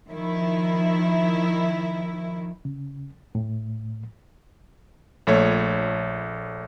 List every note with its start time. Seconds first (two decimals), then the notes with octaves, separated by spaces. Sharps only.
0.10 D#3 F3 E4
2.65 C#3
3.35 A2
5.27 A#1 A3 C#5